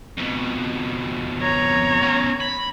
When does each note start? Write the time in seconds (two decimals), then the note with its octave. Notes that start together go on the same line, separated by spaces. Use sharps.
0.17 F2 B2
1.42 C#5 A#5
2.02 B3 C#4
2.40 B5